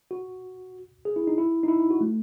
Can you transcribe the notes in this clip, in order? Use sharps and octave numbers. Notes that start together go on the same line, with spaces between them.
F#4
G#4
E4
D#4
E4
D#4
E4
E4
F#4
A3